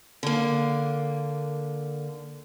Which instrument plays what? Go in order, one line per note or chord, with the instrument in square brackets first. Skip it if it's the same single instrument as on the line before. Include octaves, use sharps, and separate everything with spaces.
[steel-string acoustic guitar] D3 A#3